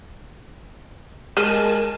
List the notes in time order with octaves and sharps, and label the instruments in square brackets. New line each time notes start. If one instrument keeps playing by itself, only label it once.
[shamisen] G#3 [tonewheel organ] A#4 G#5 A5